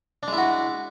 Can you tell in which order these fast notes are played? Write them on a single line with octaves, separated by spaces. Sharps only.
D4 G#3 E4 F#4